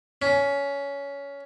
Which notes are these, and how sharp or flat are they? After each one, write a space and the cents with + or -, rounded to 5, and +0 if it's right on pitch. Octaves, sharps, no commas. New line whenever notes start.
C#4 +20